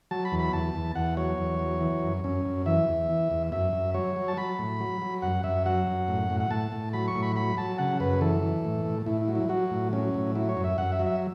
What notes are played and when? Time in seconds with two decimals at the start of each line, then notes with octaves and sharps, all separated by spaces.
0.11 F#3 A5
0.25 B5
0.32 E2
0.39 B5
0.53 E2 A5
0.75 E2
0.95 E2 F#5
1.17 F#3 C#5
1.38 E2
1.59 F#3
1.81 E3
2.03 F#2
2.24 F#2 C#4
2.45 F#2
2.66 E3 E5
2.89 E2
3.09 E3
3.31 E2
3.52 F#2 E5
3.73 F#2
3.94 F#3 C#5
4.16 F#3
4.28 A5
4.37 F#3 B5
4.59 A2
4.80 F#3
5.02 F#3
5.22 F#2 F#5
5.44 F#2 E5
5.66 F#3 F#5
5.87 F#2
6.08 A2
6.30 A2
6.40 F#5
6.51 A2 A5
6.72 A2
6.93 F#3 B5
7.08 C#6
7.15 A2
7.23 B5
7.36 F#3 B5
7.57 F#3 A5
7.78 C#3 F#5
8.00 F#2 B4
8.21 E3 A4
8.43 E3
8.65 A2
8.85 A2
9.06 A2 E4
9.21 E4
9.28 F#3
9.35 E4
9.49 F#3 F#4
9.71 A2
9.93 F#3 C#4
10.14 A2
10.35 F#3 E4
10.49 C#5
10.57 F#2
10.64 E5
10.78 F#2 F#5
10.92 E5
10.99 F#3
11.06 E5